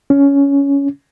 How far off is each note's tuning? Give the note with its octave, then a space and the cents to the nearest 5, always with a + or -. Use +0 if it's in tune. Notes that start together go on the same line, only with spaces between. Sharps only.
C#4 +15